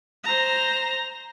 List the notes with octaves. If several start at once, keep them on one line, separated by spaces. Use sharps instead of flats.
C5 A#5